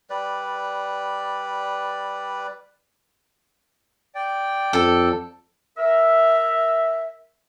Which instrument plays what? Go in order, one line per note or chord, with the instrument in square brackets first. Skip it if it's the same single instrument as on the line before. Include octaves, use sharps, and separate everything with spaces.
[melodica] G3 B4 D5
[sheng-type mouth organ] D5 G5
[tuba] F2 [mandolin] A4
[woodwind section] A#4 E5